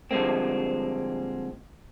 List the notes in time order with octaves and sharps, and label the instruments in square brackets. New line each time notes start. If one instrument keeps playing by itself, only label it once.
[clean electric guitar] D3 F3 G3 G#3 A#3 C4